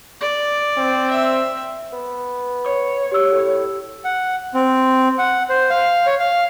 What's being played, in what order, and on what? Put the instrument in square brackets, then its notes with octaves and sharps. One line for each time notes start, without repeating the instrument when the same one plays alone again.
[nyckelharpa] D5
[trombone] C4
[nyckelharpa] E5
[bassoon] B3
[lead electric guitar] C#5
[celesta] G4 E6
[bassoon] A2
[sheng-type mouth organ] F#5
C4
F#5
C5
F5
C#5
F5